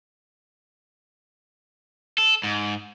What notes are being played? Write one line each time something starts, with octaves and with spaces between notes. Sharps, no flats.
A4
G#2